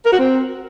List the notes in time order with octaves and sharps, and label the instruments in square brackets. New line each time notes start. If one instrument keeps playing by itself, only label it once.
[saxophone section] A#4
F#4
C4